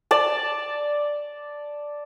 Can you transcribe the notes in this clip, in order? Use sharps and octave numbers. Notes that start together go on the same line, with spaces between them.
D5 A5